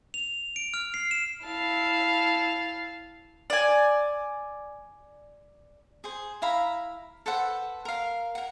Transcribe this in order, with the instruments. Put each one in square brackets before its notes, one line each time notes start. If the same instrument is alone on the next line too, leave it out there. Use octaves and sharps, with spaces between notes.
[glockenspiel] F7
D7
F6
C7
E7
[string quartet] E4 F5 A5
[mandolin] D5 G#5
[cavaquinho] G#4 C5
E4 F5 A#5 B5
A4 B4 C5 F#5
A#4 F5
A#4 F#5